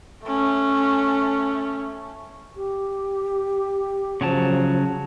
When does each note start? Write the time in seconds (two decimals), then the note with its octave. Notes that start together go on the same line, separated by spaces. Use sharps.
0.24 A3 C#4
2.56 G4
4.21 C#3 F3 F#3 A5